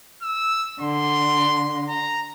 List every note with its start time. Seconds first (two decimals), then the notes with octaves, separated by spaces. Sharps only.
0.22 E6
0.81 D3 C6
1.88 A#5